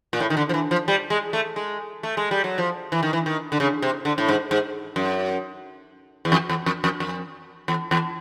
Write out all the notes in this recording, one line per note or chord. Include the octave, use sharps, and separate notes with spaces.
A#2
A2
D#3
D3
F3
E3
F3
G3
G#3
A3
G#3
A3
G#3
G3
F#3
F3
E3
D#3
E3
D#3
D3
C#3
C3
D3
A2
G#2
G#2
F#2
E2
F2
E2
F2
F2
F2
E2
E2